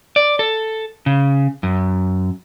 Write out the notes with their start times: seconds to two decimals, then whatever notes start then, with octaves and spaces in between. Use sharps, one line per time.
0.16 D5
0.39 A4
1.06 C#3
1.63 F#2